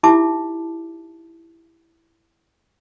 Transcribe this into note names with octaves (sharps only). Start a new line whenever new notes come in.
D#4 E4 G4 E5 A5 D6